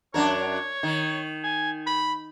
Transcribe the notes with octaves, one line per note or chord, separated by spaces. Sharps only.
F#2 D4 A#4 C#5
D#3
G#5
B5